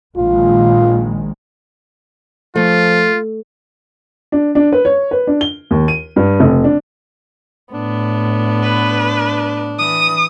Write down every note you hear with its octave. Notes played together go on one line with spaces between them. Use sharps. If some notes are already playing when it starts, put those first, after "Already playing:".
A#1 D#3 G#3 F4
F3 A3 F4
D4
D4
B4
C#5
B4
D4
G7
D#2
D#7
G2
F1
D4
A2 B3 D4
B4
E3 D#6